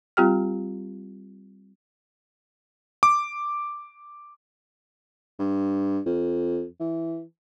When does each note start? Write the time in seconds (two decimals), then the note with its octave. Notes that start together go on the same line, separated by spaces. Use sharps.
0.17 G3 C4 F4 G4 G5 F6
3.03 D6
5.39 G2
6.06 F2
6.80 E3